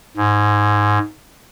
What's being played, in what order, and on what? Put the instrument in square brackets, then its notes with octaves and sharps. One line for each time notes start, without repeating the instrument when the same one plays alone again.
[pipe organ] G#2